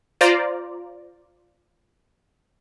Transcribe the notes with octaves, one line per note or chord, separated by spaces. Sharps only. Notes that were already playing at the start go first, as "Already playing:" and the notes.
F4 C5 D5 A#5